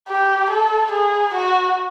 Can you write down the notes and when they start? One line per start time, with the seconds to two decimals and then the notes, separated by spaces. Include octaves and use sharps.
0.08 G4
0.50 A4
0.92 G#4
1.34 F#4